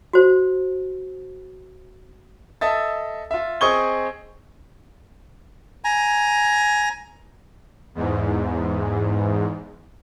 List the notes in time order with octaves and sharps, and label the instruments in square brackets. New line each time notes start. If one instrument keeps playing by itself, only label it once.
[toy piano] F#4 C5
[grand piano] A4 D#5 E5 A6
F4 E5
C4 G#4 D#5 C#6 G#6 G7
[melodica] G#5 A#5
[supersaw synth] E2 G#2